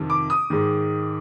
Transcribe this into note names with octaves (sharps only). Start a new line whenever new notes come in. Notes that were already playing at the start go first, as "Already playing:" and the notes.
Already playing: F2 C3 D#3
D6
D#6
G#2 D#3